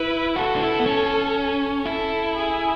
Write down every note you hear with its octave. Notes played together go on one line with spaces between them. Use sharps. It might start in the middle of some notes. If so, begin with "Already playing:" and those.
Already playing: E4 B4
F#4 A4
D4
E4
B3
C#4
E4 A4
G#4